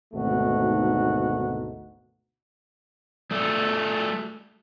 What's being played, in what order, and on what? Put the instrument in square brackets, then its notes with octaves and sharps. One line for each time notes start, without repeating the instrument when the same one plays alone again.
[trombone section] G#1 D2 B2 A3 D#4 F#4
[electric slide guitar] G3 A3 A4